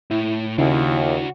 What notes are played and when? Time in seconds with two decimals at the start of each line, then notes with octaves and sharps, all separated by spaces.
0.11 A2 E4
0.58 D#2 C#3 D4 E4 F#4